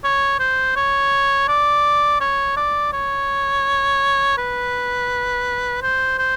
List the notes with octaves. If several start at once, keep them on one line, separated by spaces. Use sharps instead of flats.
C#5
C5
C#5
D5
C#5
D5
C#5
B4
C5
C5